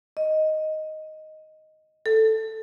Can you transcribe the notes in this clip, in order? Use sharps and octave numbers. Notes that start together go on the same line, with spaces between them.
D#5
A4